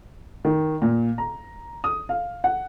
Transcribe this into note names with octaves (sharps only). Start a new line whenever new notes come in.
D#3
A#2
A#5
D#6
F5
F#5